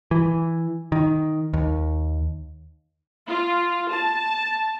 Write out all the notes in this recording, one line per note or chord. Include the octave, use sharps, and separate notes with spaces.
E3
D#3
D#2
F4
A5